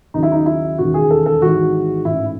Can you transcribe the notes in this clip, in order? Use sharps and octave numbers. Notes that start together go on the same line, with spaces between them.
D#2 C#3 F#3 D#4
E4
D#4
E4
E1 D#2 C#3 E3 F#4
G#4
A4
A4
G#1 G#2 E3 F#4
A1 G#2 E3 E4